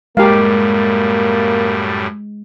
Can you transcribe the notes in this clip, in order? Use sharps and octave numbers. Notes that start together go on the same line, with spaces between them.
F#2 A2 G3 G#3 A#3 G4 A#4 F5